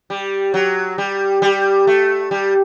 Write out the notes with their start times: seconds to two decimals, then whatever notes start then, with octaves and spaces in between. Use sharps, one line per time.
0.10 G3
0.54 F#3
0.98 G3
1.42 G3
1.87 A3
2.31 G3